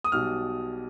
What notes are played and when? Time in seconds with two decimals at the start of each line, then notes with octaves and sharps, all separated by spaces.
0.04 D#6
0.12 B1 B2 G3 F6